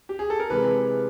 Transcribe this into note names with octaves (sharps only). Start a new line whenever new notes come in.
G4
G#4
A4
A#4
C3 E3 G#3 B4